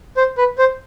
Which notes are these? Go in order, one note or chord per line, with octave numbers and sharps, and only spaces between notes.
C5
B4
C5